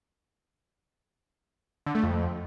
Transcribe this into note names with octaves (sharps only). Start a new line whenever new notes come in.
D3
A3
F2